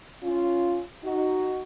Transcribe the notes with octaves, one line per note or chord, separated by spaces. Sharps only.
C#4 F4
D#4 F#4